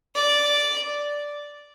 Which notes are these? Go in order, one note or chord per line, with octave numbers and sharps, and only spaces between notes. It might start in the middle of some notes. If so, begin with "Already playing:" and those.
D5